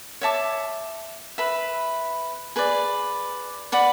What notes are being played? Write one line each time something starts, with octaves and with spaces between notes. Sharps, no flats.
C#5 E5 A5 D6
B4 E5 B5
G#4 B4 D5
B4 D5 F#5